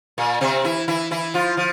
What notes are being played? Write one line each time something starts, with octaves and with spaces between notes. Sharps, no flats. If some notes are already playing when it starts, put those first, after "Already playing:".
A#2 A#3
C3 C4
E3 E4
E3 E4
E3 E4
F3 F4
F3